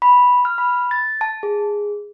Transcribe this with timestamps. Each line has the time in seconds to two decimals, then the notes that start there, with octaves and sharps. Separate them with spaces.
0.02 B5
0.45 F6
0.58 B5
0.91 A6
1.21 A5
1.43 G#4